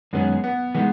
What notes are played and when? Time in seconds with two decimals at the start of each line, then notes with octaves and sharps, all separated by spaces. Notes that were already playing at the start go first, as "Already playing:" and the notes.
0.13 F#2 D#3 G#3 B3 C#4 G#4
0.44 B3
0.75 E3 G#3 B3 D#4